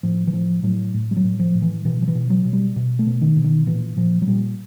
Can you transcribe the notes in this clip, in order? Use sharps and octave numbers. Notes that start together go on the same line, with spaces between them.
A2 F3
E3
A2 F3
A2 F#3
A2
G3
F#3
A2
F3
A2
E3
B2 E3
F3
E3
B2
F#3
B2
G3
B2
A3
B2
D#3
B2
D#3
A#2 E3
A#2 F3
F#3
A#2 G3